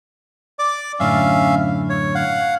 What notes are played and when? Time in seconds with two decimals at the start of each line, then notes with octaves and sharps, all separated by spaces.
0.59 D5 D6
1.00 F#2 A2 D3 C#4 E5 F5
1.90 C#5
2.15 F5 F#5